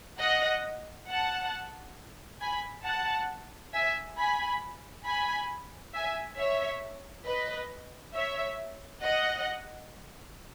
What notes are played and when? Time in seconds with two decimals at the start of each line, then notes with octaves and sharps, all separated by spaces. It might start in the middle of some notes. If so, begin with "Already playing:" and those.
0.20 D#5 F#5
1.09 F#5 A5
2.41 G#5 B5
2.85 F#5 A5
3.73 E5 G#5
4.18 G#5 B5
5.05 G#5 B5
5.94 E5 G#5
6.38 C#5 E5
7.26 B4 D#5
8.15 C#5 E5
9.03 D#5 F#5